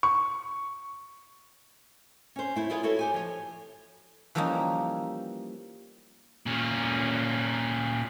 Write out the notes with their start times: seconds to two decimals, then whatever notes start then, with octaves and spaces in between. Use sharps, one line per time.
0.03 C#6
2.36 C#4 C5
2.56 A3 E4 C5
2.70 E4 F4 G#4 B4 C#5 F5
2.83 E4 F#4 A4 C#5
2.99 G4 C5 G#5
3.14 F3 C#5
4.35 E3 F3 G3 A#3 C#4 D#4
6.46 A#2 C#4